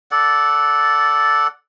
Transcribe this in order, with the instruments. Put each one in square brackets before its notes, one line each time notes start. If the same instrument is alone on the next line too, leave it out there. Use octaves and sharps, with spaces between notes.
[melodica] A4 D5 F#5